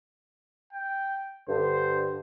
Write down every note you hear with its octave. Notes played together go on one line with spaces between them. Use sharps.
G5
G2 D3 C5